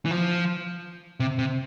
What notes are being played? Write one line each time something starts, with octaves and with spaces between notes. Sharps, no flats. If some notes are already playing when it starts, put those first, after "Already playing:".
E3
F3
C3
C3